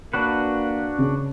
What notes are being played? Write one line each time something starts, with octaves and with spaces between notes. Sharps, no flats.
A#3 D4 F#4 B4
C#3